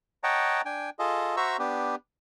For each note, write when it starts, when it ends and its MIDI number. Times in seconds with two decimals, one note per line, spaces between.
0.24 0.61 73
0.24 0.61 75
0.24 0.61 78
0.24 0.61 79
0.24 0.61 81
0.24 0.61 82
0.65 0.90 62
0.65 0.90 79
0.65 0.90 80
0.99 1.36 65
0.99 1.36 68
0.99 1.36 69
0.99 1.36 75
1.37 1.57 66
1.37 1.57 72
1.37 1.57 76
1.37 1.57 82
1.37 1.57 85
1.37 1.57 88
1.59 1.95 59
1.59 1.95 62
1.59 1.95 67